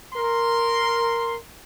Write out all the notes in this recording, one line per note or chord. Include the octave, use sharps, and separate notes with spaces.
A#4 C6